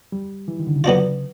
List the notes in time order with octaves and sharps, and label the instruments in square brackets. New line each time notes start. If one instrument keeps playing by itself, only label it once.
[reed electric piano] G3
E3
D#3
D3
C#3
[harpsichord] D3 F#3 B3 D4 F4